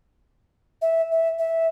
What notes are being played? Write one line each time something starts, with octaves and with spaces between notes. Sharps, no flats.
E5
E5
E5